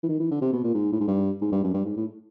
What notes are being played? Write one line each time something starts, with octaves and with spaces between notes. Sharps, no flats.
E3
D#3
E3
D3
C3
B2
A#2
G#2
A2
G#2
G2
G#2
G2
F#2
G2
G#2
A2